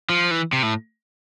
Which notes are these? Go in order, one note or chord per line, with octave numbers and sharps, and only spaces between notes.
F3
E3
C3
A2